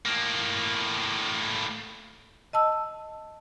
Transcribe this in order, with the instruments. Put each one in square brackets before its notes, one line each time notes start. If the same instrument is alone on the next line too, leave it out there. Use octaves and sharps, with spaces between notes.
[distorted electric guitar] A2 A#3
[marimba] D#5 A5 E6